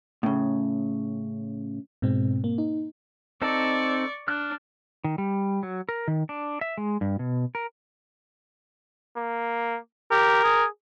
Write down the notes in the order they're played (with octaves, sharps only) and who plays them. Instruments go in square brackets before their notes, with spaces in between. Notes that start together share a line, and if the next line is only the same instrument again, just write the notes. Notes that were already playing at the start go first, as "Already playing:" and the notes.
[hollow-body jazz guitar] A2 C#3
[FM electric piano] G#2 B2 G#3 C4
A#3
D#4
[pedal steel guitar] C4 D#4 A4 [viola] D5 C#6
[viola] D4 [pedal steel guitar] F6 F#6
[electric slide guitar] D#3
G3
F#3
A#4
D#3
D4
E5
G#3
G2
B2
A#4
[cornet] A#3
[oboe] G4 [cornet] A#4
[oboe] G#4